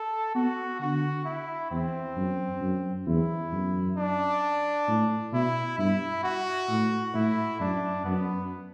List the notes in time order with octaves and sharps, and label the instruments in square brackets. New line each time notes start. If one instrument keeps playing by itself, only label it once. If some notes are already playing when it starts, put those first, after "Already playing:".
Already playing: [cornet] A4
[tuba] B3 [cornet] F#4
[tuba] D3 [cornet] F#4
[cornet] E4
[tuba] E2 [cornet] C4
[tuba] F#2
F#2
[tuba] E2 [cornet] E4
[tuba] F#2
[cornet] D4
[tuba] A2
[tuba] B2 [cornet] E4
[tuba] G2 [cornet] E4
[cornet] F#4
[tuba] A2
[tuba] A2 [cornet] E4
[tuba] F#2 [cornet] D4
[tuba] F#2 [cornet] B3